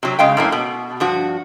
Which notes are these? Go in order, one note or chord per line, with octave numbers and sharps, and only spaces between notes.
C3 F#3
C#3 G#3 F5 G5
F#2 A2 A#3
B2
G2 F3 F#4